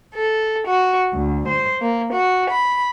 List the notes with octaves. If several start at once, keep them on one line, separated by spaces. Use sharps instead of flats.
A4
F#4
D2
C5
A#3
F#4
B5